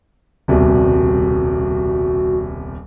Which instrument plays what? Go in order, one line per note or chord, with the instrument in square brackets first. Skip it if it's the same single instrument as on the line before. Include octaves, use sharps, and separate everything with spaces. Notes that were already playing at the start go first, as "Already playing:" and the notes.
[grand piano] D#1 C2 B2 [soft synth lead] F#4